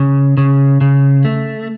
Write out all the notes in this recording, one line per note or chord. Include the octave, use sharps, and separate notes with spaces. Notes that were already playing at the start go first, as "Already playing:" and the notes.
Already playing: C#3
C#3
C#3
A3